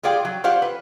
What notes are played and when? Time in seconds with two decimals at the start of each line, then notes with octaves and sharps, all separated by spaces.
0.03 G3 F4 G#4 D5 F5 G5
0.25 F#3
0.44 F4 G4 C5 D5 F5 F#5
0.62 B4